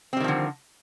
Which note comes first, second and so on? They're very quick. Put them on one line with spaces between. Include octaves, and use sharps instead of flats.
C4 G3 D#3 F3 D3